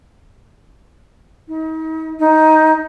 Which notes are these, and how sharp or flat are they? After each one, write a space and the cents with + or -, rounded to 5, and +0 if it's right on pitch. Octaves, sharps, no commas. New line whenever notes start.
D#4 +40
D#4 +10